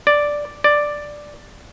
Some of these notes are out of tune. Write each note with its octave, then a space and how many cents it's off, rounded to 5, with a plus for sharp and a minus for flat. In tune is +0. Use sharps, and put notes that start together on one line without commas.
D5 +0
D5 +5